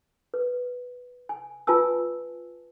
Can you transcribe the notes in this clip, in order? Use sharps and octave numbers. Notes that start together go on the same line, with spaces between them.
B4
G#5
F4 B4 G#5 A5 E6